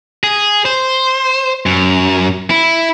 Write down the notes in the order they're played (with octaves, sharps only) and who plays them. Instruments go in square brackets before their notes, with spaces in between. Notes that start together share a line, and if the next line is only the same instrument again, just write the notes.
[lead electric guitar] G#4
C5
F#2
E4